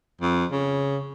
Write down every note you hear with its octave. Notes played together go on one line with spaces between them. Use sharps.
F2
C#3